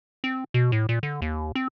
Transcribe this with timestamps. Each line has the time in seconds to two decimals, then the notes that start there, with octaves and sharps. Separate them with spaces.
0.24 C4
0.54 B2
0.72 A2
0.89 A#2
1.03 D3
1.22 D#2
1.55 C4